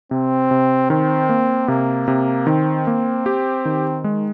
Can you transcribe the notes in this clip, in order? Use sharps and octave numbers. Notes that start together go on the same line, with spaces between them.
C3 C4
C3
D#3 C4
A#3
C3 A#3
C3
D#3 C4
A#3
G4
D#3
G#3